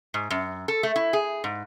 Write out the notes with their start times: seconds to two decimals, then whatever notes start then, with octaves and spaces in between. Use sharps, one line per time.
0.14 G#2
0.30 F#2
0.68 A4
0.83 A3
0.96 E4
1.13 G#4
1.44 G#2